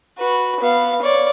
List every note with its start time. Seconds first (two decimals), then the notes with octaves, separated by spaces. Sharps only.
0.18 F#4 B4
0.60 B3 F5
1.02 C#5 D5